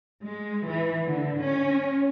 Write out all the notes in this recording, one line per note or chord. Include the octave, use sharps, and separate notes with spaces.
G#3
E3
D3
C#4